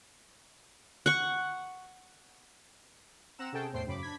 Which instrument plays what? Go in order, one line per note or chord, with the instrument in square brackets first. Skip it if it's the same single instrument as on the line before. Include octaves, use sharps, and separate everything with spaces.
[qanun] F#5 C#6
[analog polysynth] C4 F#5 A#5 E6 E7
C3 C#4 G#4 A4 G5 A5
E2 A2 C5 G5 C7
F#2 C#3 B5 D6
D4 B5 G#6 B6